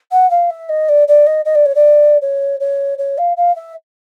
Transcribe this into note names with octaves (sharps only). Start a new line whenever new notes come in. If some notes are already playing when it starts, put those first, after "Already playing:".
F#5
F5
E5
D#5
D5
D5
D#5
D#5
D5
C#5
D5
C#5
C#5
C#5
F5
F5
E5